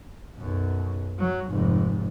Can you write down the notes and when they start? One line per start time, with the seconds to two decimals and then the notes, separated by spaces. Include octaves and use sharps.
0.38 B1 F#2
1.19 F#3
1.50 F1 G#2